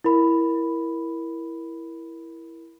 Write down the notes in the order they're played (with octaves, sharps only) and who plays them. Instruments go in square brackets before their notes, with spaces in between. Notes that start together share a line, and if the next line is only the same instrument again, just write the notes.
[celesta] E4 A#4 B5